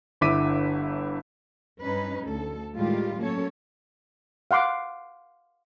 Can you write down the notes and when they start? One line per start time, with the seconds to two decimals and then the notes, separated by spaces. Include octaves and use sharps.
0.21 G1 D3 E4 D6 B6 D#7
1.82 G2 C#4 D#4 B4
2.25 D2 A4
2.75 A2 D#3 G3 G#3 F4 G4
3.20 F#3 A#3 C#4 A4 C#5
4.51 F5 F#5 C6 D6